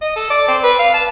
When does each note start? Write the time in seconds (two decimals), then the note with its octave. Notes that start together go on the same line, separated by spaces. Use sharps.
0.01 D#5
0.16 A4
0.30 D5
0.48 C4
0.63 B4
0.79 F5
0.94 A5